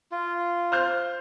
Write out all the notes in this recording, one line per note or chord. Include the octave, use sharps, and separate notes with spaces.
F4
C5 F6 G6